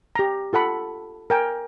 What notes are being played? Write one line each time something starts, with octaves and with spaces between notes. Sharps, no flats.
G4 A#5
F4 A4 F#5 B5
A#4 G5 G#5